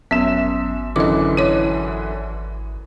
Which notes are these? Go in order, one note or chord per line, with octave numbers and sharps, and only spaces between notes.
G#1 F#2 B3 E5 E7
F#2 D3 E3 D#5 D6
E4 C#5